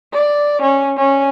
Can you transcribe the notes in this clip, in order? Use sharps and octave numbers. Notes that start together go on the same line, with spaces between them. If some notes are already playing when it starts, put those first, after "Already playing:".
D5
C#4
C#4